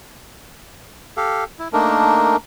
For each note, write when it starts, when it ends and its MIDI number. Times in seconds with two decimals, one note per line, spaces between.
1.17 1.44 67
1.17 1.44 69
1.17 1.44 77
1.59 1.68 64
1.73 2.37 57
1.73 2.37 58
1.73 2.37 62
1.73 2.37 63
1.73 2.37 70